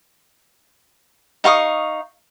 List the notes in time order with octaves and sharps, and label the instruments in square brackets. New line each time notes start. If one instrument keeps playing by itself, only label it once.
[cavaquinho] D#4 F5 C#6 D#6